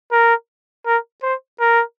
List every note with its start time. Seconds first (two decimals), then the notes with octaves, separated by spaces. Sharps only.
0.12 A#4
0.86 A#4
1.23 C5
1.60 A#4